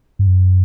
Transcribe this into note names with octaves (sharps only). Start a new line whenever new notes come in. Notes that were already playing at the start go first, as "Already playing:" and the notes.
G2
F#2